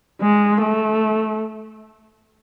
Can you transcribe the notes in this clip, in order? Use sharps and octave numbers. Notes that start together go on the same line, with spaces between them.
G#3
A3